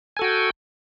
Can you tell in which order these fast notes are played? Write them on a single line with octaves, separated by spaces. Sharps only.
G#5 A4 F#4 G5